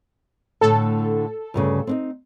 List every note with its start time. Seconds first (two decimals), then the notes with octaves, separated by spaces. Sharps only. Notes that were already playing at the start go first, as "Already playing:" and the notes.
0.61 A2 D3 A4
1.54 D2 G2 C#3
1.87 C4 D4 D#4